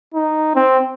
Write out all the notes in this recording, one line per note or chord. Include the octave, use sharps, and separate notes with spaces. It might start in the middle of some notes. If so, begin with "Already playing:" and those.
D#4
C4